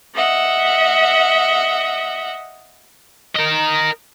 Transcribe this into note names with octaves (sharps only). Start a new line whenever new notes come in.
D#5 E5 F#5
A#4 D#5